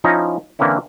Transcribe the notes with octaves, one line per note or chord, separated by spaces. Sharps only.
F3 C#4 D#4 E4 A#5
D3 E3 A#3 C4 C#4 E4